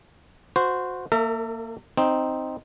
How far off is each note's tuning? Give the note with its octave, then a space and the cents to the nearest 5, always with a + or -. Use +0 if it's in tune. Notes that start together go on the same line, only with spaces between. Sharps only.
F#4 -20 C5 -15
A#3 -15 A4 +45 E5 +0
C4 +0 D#4 +0